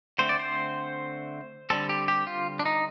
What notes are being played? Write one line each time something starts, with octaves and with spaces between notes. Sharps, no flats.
D3 A3 C4 C5
D5
C5
D3 G3 C4 A4
G4
G4
F4
D4
D#4